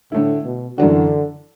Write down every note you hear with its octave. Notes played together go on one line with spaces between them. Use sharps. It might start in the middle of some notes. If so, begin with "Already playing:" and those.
A2 D3 A3 E4
B2
F#2 D3 E3 D4 F#4